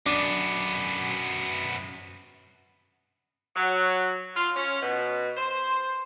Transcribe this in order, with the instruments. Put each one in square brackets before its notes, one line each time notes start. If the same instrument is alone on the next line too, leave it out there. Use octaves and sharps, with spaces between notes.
[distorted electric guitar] F#2 B3 [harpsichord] D4
[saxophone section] F#3
F4
C#4
B2
C5